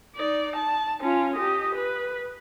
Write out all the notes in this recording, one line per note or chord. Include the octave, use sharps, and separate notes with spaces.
D#4 D5
A5
C#4 F4
G4 D#5
B4